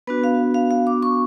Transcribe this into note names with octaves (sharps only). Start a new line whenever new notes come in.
B3 D4 F#4 B4
F5
F5
F5
D6
C#6